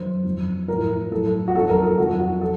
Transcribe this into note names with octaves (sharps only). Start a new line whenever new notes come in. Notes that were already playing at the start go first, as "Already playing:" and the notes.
Already playing: F#2 D#3 F#3 C5
F2 D#3 F#3
A2 F3 A#4
A2 F#3 A4
F#4
F2 D#3 F#3 A4
A#4
A4
F2 D#3 F#3 F#4
F#4
F3 A4